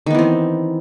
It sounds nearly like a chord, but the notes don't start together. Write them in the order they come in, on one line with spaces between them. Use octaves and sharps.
D#3 B3 E3 C4